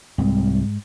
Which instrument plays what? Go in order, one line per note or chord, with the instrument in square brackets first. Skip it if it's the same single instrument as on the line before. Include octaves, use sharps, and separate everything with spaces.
[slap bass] C2 [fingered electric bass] G#2 G#3